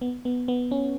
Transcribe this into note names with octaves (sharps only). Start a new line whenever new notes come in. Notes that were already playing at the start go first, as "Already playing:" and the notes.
B3
B3
B3
C#4